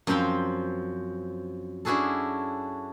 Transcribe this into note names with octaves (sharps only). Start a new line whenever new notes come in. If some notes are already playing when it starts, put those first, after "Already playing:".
F#2 F3 C4 C5 F5 G5
C#4 D4 E4 F#4 G#4 A4